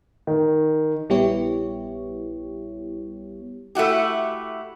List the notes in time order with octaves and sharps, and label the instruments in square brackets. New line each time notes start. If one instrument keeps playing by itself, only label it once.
[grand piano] D#3
[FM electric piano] A#1 G3 B3 E4 G4 C#5
[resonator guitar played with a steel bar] A3 E4 F#4 G4